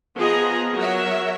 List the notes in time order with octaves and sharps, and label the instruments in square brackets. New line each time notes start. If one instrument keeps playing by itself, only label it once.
[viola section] F3 B3 G#4 D#5 A#5
F#3 A#4 E5